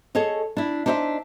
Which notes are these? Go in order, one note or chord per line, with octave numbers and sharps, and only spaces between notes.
G#4 A4 C#5 D#5
D4 E4
D4 D#4 C5 D#5 E5